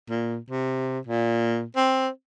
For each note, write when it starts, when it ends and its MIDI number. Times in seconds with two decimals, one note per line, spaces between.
0.10 0.37 46
0.50 0.99 48
1.07 1.64 46
1.76 2.08 60